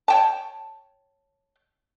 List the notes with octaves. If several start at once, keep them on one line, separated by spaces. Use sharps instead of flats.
C#5 G5 A5